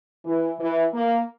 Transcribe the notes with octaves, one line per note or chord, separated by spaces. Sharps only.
E3
E3
A#3